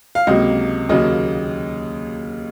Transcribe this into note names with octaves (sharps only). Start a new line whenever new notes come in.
F5
C#2 C3 F#3 A#3 D#5
D#2 C#3 F#3 A#3 D#5